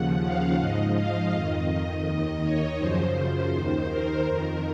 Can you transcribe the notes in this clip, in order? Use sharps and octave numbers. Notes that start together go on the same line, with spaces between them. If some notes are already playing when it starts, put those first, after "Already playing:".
Already playing: D#2 C#3 F3 F#5
F5
G#2 F3 D#5
F5
F2 D#3 D#5
D#2 D#3 D#5
C#5
F#2 C#3 F3 C5
D#2 D#3
A#4
F2 D#3 A#4